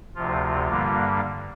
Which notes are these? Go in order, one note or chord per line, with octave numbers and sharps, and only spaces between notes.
D2 C3 F3 F4
G2 D3 G3 A#3